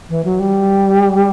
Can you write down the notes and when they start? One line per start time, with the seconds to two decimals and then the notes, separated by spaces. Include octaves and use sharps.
0.09 E3
0.24 F#3
0.39 G3